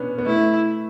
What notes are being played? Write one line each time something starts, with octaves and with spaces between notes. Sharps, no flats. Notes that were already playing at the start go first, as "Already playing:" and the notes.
Already playing: B3 C#4 D4
B3
A3 E4